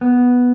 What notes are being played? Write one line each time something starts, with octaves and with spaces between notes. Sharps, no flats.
B3